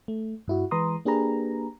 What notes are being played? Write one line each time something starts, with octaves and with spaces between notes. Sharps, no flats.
A3
G2 E4 F#4
E3 G#3 B4 A#5 C6 D#6
A#3 D4 G4 G#4 B4 A#5